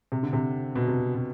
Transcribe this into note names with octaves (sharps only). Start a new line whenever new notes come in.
C3
D3
C3
B2
C3
B2